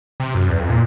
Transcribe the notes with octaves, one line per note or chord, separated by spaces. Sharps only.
C3
F#2
E2
F2
A#2